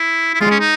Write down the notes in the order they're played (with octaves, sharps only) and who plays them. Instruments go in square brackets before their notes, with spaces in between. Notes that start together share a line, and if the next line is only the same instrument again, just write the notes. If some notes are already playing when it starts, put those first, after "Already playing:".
Already playing: [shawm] E4
E4
[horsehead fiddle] G#3 [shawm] F4
[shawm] C#4
D#4